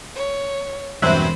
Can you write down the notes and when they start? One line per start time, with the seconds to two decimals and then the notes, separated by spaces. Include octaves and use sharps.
0.15 C#5
1.02 E1 G2 F#3 C4 C5 E5 B5 F#6